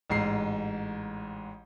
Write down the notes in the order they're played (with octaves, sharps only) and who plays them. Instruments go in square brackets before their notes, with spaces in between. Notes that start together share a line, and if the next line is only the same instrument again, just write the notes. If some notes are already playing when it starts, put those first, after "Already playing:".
[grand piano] A1 G#2 C7